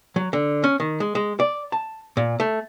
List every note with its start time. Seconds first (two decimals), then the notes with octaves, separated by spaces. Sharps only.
0.16 F#3
0.33 D3
0.64 C#4
0.80 D#3
1.00 G#3
1.15 G#3
1.40 D5
1.72 A5
2.17 A#2
2.40 A3